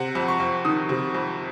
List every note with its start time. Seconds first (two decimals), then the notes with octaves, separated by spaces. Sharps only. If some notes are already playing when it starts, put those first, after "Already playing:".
Already playing: C3 F#5
0.15 F2
0.28 C#6
0.40 F2
0.65 D#3 D#6
0.89 C3
1.15 F2